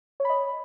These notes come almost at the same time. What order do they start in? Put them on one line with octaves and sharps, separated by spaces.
C#5 B5 D#5